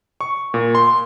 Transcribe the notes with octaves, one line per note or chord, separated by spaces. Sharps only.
C#6
A#2
C6